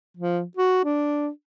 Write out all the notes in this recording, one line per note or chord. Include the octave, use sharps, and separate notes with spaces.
F3
F#4
D4